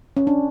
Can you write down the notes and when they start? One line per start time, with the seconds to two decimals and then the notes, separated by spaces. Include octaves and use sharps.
0.17 C#4
0.27 D4